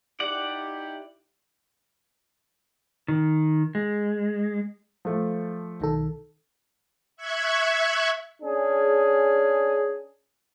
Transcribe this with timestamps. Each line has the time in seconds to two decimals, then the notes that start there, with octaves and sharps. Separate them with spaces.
0.20 D#4 E4 G4 D5 F#5
3.08 D#3
3.75 G#3
5.05 F3 A3
5.80 B1 D#3 A4
7.17 E5 C#6 F#6 G#6
8.42 C#4 D4 G#4